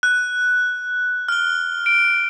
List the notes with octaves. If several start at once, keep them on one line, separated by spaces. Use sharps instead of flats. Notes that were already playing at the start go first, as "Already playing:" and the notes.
F#6
F6 G7
D7